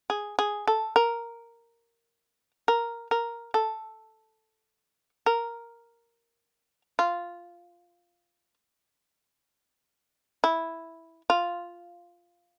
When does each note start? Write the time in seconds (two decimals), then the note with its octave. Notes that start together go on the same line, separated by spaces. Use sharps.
0.10 G#4
0.39 G#4
0.67 A4
0.96 A#4
2.68 A#4
3.11 A#4
3.54 A4
5.26 A#4
6.99 F4
10.44 E4
11.30 F4